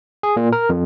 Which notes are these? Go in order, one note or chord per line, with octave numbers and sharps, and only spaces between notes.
G#4
A#2
A#4
F2